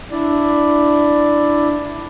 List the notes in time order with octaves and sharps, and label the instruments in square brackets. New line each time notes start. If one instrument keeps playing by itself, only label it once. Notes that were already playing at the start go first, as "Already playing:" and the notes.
[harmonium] D4 E4 D5